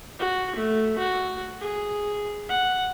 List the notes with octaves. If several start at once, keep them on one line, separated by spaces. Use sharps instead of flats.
F#4
A3
F#4
G#4
F#5